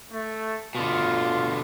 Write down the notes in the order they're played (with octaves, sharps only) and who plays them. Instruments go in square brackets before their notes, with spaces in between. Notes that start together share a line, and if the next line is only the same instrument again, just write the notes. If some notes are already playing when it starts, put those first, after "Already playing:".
[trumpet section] A3
[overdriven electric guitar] B2 D3 [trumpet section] F4